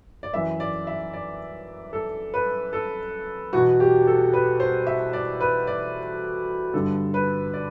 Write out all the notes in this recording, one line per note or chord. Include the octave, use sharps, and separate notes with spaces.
D5
F#2 E3 E5
D5
E5
D5
A4
B4
A4
E2 B2 F#4
G4
A4
B4
C5
E5
D5
B4
D5
G2 D3 A4
B4
D5